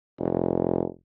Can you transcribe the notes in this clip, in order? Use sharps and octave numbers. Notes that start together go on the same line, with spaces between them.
F1